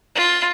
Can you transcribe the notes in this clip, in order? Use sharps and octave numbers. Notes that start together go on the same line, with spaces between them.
F4